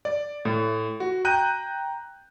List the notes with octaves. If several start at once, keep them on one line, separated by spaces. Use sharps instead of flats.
D5
A2
F#4
G5 A#5 F#6 G6 D#7